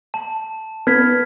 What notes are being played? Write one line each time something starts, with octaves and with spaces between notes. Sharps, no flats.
A5
B3 F6 G#6 B6